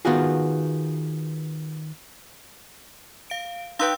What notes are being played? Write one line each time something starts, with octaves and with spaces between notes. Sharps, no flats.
D#3 B3 F4 F#4 G#4
F5 D7
D#4 B4 F5 G5 C6 E6